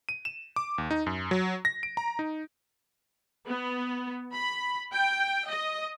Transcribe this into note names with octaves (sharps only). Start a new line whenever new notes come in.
D#7
E7
D6
D#2
D#4
F#2
F#3
A#6
D7
A#5
D#4
B3
B5
G5
D#5